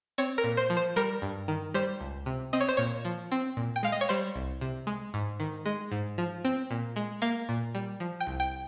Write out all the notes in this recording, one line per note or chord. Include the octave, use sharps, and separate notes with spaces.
C4 C#5
A#4
A#2
C5
F3
C5
G3 A#4
G2
D#3
G3 C5
C#2
C3
C4 D#5
C#5
C5
A#2 C#5
F3
C4
A#2
G5
G#3 F5
D#5
C#5
G3 C5
C2
C3
G#3
G#2
D#3
G#3
G#2
F3
C4
A#2
G#3
A#3 F5
A#2
G3
F3
G5
C2
G5